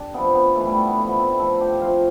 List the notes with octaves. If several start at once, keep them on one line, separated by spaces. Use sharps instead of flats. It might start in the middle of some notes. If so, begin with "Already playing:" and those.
Already playing: D4 G4
C3 F3 B3
B3
A2 E3 A3
G3
A3
B3
A2 F3 A3
B3
C4
E4
A2 F3 A4
G4
C3 F3 F4